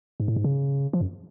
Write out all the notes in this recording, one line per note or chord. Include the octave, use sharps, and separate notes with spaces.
G#2
A2
G#2
C#3
F3
F#2